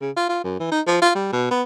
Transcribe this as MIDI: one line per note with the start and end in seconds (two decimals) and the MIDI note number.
0.01 0.11 49
0.16 0.27 65
0.29 0.40 65
0.44 0.58 42
0.60 0.68 52
0.72 0.81 63
0.87 1.00 53
1.02 1.10 65
1.15 1.32 55
1.33 1.49 47
1.51 1.63 59